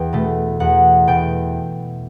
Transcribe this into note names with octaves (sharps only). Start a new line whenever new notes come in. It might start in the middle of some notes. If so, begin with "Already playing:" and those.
Already playing: E2 G5
B2 A3
E2 F#5
B2 A3 G5